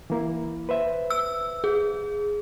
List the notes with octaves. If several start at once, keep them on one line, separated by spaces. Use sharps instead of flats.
E3 A#3 E4
B4 C5 E5
E6
G#4